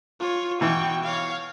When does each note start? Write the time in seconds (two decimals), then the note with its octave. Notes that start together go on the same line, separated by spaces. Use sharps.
0.20 F4 C#5
0.61 B2 E3 G5 C#6
1.04 C#5 F5